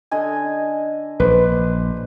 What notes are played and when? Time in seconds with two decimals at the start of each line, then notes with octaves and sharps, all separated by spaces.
0.11 D3 D#5 G#5
1.20 A#1 B4 C5